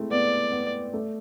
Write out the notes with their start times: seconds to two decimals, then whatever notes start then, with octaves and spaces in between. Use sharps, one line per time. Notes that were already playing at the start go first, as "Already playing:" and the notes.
Already playing: G#3 A3 C4 E4
0.11 B3 D5
0.52 B3
0.94 A3